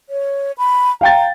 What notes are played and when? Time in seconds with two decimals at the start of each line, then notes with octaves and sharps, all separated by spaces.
0.10 C#5
0.58 B5
1.01 F5 G5 A#5 A6